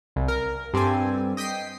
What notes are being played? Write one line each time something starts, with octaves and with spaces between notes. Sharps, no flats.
C2
A#4
G2 C4 G4 A4 G#5
D#5 G5 D#6 B6 C7